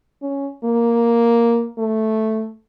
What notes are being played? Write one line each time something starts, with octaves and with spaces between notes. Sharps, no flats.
C#4
A#3
A3